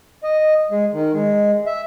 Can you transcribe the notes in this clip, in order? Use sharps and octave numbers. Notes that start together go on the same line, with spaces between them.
D#5
G#3
D#3
G#3
E5